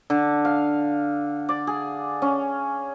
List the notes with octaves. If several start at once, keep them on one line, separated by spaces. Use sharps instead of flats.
D3
F5
D5
G#4
C#4